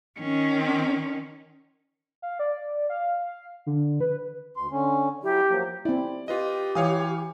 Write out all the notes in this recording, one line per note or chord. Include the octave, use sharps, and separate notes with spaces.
D#3 C#4
F5
D5
F5
D3
B4
D2 C6
D3 C#4
F#3 E4 G4
F3 F#3 A#3
C4 E4 D5
F4 G4 B4 D#5
E3 C#5 F5 D#6